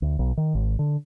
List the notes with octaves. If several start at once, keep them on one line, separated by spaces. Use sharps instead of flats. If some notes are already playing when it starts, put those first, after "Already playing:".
D2
B1
D#3
G#1
D3